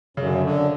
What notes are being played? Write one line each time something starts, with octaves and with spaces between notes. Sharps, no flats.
F#2 C#3
D3
C#3
D3